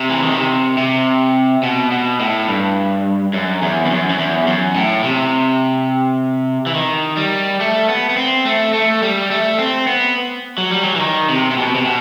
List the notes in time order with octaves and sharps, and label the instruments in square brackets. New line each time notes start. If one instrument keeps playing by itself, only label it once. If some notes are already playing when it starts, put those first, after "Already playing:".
Already playing: [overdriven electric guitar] C3
E3
D#3
C3
C3
B2
B2
A2
G2
F#2
E2
E2
F#2
F#2
E2
F#2
A2
C3
E3
D#3
G3
A3
B3
B3
C4
A3
A3
G3
A3
C4
B3
F#3
G3
F#3
E3
D#3
C3
C3
B2
C3
B2